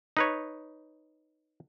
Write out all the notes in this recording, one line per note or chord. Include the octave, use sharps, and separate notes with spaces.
D#4 B4 C#5